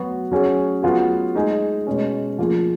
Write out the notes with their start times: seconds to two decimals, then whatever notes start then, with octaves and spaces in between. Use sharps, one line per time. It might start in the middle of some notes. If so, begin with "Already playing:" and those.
Already playing: F#3 B3 F#4
0.32 F#3 C#4 G#4
0.83 F#3 B3 F4 G#4
1.35 G#3 D#4 G#4
1.87 B2 G#3 C#4
2.38 F3 A#3 F4 G#4